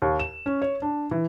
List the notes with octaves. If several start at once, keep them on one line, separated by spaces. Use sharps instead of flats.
D#2
E7
C#4
C#5
D4
E3